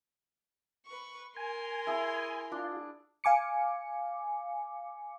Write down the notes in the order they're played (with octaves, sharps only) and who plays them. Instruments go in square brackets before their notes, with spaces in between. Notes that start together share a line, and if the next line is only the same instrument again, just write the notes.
[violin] B4 C#6
[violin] A#4 C6 [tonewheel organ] G#5
[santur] E4 G#4
[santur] D4 [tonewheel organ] F4
[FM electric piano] F5 G#5 D6 C#7